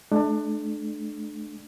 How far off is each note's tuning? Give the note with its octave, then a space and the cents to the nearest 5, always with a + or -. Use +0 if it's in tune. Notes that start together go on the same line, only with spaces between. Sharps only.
A3 -30 D4 +25